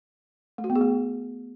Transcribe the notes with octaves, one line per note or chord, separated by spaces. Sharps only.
A3
F#4
B3
G#4
A3